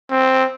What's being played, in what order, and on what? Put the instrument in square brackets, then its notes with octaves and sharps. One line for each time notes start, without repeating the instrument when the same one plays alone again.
[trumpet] C4